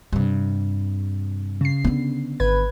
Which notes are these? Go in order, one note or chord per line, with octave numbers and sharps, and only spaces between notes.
G2 C3
C#3 C7
D3 B3
G#1 B4 G#6